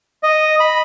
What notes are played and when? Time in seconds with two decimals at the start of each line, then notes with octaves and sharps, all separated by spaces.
0.23 D#5
0.60 B5